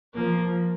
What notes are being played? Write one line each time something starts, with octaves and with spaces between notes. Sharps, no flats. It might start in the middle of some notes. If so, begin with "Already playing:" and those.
F3 A#3